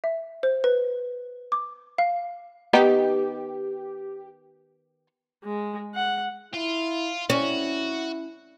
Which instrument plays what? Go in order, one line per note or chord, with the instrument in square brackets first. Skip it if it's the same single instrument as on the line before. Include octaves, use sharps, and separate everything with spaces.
[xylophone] E5
C5
B4
D6
F5
[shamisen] D#3 B3 D#4 [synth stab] G4
[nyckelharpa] G#3
F#5
[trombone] E4 [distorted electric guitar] F4
[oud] C#4 [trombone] E4 [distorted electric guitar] F#4